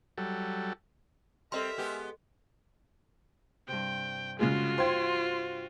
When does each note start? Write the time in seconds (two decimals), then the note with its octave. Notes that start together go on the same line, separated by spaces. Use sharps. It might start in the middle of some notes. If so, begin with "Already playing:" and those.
0.18 F#3 G3 A4
1.52 G3 C4 A4 A#4 D#5 E5 C6
1.78 G#3 B3 G4
3.68 G2 C3 G5
4.39 C#3 G#3 F4 F#4 G#4
4.78 C5 F5 G5 C6 G#6